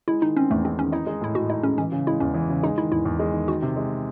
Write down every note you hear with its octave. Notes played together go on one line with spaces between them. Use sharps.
G#3 E4
D#3 D#4
C4 C#4
E2 A3
G#3 C4
D#3 C#4
D#4 E4
G#3
A2 E4
A2 F#4
D#4 E4
G#3 C#4
E3 C#4
C#3
G#3 E4
E2 C#4
E3
C#3
G#3 D#4
D#3 E4
E2 E4
E2
G#3
D#3
D#3 F#4
C3
G#3